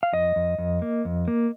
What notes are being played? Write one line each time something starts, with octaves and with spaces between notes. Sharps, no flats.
F5
F2 D#5
F2
F2
A#3
F2
A#3